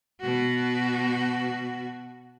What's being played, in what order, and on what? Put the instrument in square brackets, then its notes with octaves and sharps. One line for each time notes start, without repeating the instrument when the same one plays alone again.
[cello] B2 F#4